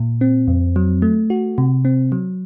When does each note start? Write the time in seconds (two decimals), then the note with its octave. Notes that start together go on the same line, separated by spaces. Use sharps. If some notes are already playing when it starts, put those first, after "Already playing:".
Already playing: A#2
0.21 C4
0.48 F2
0.76 F#3
1.02 A3
1.30 F#4
1.58 C3
1.85 C4
2.12 F#3